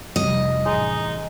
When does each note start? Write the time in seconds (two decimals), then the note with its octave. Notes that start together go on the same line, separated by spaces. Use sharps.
0.16 F1 G3 D#5
0.66 A1 G#3 D#4